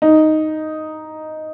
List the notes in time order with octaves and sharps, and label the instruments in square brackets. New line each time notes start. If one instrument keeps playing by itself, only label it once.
[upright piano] D#4